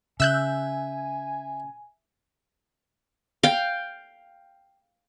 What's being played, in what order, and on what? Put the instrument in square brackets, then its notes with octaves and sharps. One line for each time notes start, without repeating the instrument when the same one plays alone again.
[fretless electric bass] C#3 [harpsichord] E5 [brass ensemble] G#5 [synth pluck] E6 F#6 G6
[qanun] F5 G5